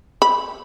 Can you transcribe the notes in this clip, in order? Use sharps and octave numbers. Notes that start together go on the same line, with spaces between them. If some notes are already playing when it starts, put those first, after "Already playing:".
B5